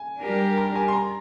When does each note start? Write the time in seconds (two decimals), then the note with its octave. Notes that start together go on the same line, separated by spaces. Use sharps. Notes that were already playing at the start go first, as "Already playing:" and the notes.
Already playing: G#5
0.22 G3 D4 G4 A#4
0.57 A#5
0.75 G#5
0.88 C6
0.93 A#5